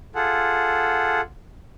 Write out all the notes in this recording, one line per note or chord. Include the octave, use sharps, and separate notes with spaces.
F4 G#4 A4 F#5